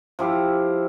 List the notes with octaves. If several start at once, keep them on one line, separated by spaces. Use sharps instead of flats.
F3 E4 G4 F5